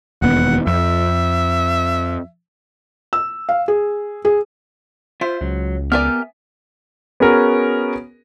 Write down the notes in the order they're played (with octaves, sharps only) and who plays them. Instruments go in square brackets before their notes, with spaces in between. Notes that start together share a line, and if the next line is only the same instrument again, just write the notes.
[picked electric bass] E1 D#2 B3 [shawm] F#5
[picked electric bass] F2 [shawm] E5
[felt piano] E6
F5
G#4
G#4
[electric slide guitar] F4 E5 [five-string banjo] C5
[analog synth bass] C#2 [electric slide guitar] F#3
[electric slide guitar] B3 E5 G#5 [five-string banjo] G4 A#4 D5 [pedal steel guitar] F6
[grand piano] B3 C#4 F#4 G#4 A#4